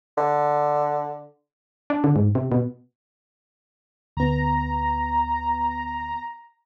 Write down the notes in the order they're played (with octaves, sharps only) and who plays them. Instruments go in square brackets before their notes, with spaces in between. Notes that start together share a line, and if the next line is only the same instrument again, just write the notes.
[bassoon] D3
[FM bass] D4
D3
G#2
C3
B2
[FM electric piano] D2 B3 [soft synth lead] A#5